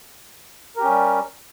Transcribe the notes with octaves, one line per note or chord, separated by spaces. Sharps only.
G3 C#4 G4 A#4